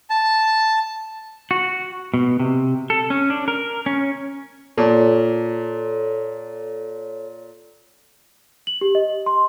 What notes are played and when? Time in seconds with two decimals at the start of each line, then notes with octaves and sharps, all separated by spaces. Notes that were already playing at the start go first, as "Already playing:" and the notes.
0.10 A5
1.51 F#4
2.14 B2
2.40 C3
2.90 A4
3.10 C#4
3.30 D4
3.48 A#4
3.86 C#4
4.78 A#2 A4 C#5
8.67 F#7
8.81 G4
8.95 D#5
9.26 C6